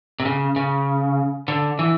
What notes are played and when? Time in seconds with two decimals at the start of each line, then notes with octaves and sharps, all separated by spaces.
0.20 C3
0.25 C#3
0.56 C#3
1.48 D3
1.79 E3